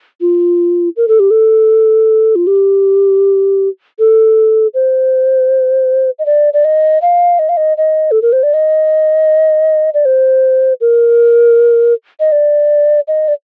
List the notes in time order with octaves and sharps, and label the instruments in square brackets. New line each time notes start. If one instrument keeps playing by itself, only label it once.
[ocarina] F4
A#4
A4
G4
A4
F4
G4
A4
C5
D#5
D5
D5
D#5
F5
D#5
F5
D#5
D#5
A4
A#4
C5
D5
D#5
D5
C5
A#4
D#5
D5
D#5
D5